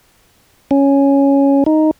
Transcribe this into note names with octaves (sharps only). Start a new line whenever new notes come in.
C#4
D#4